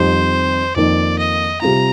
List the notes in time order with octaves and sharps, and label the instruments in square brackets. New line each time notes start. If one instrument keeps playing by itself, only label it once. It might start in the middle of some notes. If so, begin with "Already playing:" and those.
Already playing: [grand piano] F2 D#3 G3 C4 [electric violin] C5
[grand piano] F2 D#3 A#3 D#4 [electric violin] D5
[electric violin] D#5
[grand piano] C3 G3 C4 F4 [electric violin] A#5